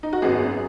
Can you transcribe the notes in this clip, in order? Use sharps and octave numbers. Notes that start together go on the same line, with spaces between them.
D#4
F#4
G#1 F#2 F#3 B3 G#4